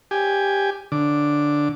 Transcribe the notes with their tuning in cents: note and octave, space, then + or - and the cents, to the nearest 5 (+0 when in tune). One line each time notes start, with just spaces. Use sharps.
G4 +10 G#5 +0
D3 +0 D6 +0